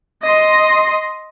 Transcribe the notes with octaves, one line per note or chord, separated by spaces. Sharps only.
D#5 C6